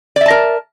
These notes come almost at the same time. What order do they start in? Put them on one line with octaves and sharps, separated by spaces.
D5 E5 A5 A#4